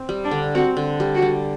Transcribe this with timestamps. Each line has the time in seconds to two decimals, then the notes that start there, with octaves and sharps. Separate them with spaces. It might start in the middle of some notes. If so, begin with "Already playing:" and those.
Already playing: C4
0.09 G3
0.24 D4
0.31 D3
0.55 C4 F#4
0.77 D3
1.00 G3
1.15 F#4
1.22 G3